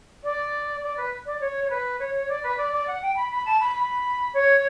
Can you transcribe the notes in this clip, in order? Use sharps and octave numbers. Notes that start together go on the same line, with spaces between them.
D5
D5
B4
D5
C#5
C#5
B4
C#5
C#5
D5
B4
D5
D5
F#5
G5
B5
B5
A5
B5
B5
C#5